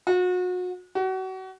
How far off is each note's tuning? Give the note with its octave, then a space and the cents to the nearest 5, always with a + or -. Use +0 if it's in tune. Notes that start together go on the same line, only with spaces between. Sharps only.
F#4 -35
F#4 +30